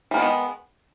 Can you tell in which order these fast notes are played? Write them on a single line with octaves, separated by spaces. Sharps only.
E3 A#3 B3 D#3 G#3